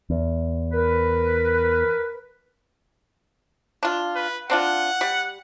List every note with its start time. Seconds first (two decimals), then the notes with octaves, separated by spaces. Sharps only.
0.10 E2
0.73 A#4 B4
3.83 D4 F4
4.15 B4
4.50 C4 D4 F4 F#5
5.01 G3